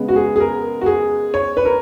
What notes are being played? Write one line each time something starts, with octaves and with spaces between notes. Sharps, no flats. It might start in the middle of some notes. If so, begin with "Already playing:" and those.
Already playing: C#3 G#3 B3
F#4
G#4
G#4
A#4
F#4
G#4
C#5
B4
A#4